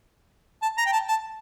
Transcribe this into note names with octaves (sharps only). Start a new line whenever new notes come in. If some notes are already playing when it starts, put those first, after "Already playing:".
A5
A#5
G5
A5
A5